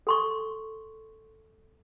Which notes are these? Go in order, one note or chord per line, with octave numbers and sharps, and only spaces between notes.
A4 C6 C#6